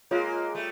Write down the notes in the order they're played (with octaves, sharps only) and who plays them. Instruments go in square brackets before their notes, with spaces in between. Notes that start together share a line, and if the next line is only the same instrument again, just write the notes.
[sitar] G#3 A#3 [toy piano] F4 G#4 C#5 F5
[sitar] G3 A3